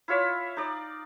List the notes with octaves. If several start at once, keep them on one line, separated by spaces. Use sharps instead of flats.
E4 F4 C#5 E5
D#4 D5